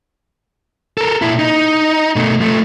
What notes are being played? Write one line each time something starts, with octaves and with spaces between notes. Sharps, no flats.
A4 A#4
A#2 E4
D#4
B2 A3
F3 A3